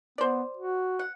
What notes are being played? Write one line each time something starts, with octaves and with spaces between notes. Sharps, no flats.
B3 C5 D5
F#4
F#5